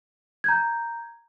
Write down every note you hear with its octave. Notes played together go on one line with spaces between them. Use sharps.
A#5 G6 G#6